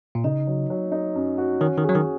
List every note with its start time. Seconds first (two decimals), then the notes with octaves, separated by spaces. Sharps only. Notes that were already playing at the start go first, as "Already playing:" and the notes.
0.15 A#2
0.24 C#3 D#4
0.47 F#3
0.70 F#3
0.92 D#4
1.15 F#2
1.38 F#4
1.60 D#3 C#4
1.78 D#3
1.84 F#3 G#4
1.95 D#3